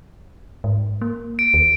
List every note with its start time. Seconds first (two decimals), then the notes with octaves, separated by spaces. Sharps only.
0.64 G#2
1.01 A#3
1.39 D7
1.54 D#2